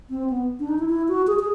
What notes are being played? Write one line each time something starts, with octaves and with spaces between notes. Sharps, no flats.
C4
B3
D4
D#4
E4
E4
F#4
G#4
G#4